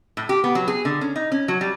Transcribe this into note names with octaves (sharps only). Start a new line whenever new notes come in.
A2
G4
B3
F#3
G#4
D3
C#4
D#4
C#4
F#3
G3